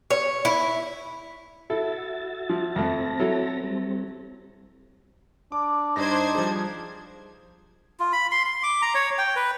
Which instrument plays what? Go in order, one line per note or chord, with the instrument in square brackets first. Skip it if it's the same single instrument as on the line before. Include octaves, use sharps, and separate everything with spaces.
[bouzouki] C#5
E4
[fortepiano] E4 A4 [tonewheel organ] F#4 E5 A6
[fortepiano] F3
[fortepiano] F2 A3 [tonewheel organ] C4 A5 A#6
[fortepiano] F#3 E4 A4
[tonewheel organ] G3 C4
[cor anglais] D4 [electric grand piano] D6
[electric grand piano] G2 A5 A#6 [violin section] D4 C5 G#6 [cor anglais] D#4
[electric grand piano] F3 G3 G#4
[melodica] F4
B5
C6
C6
D6
A#5
C#5
G5
B4